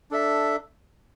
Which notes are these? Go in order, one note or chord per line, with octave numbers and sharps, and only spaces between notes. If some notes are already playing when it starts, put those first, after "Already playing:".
D4 A4 E5